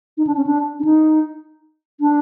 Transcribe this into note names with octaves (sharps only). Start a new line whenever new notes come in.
D#4
D4
C#4
D4
D4
D#4
D4